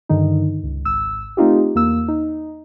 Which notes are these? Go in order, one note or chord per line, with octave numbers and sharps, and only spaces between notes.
G2 D3 D#3 D#4
C#2
G#1 E6
A3 C4 D#4 F4 G4
E2 A#3 E6
D#4